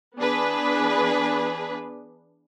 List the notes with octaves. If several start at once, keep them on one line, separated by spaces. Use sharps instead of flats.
E3 B3 D4 G#4 B4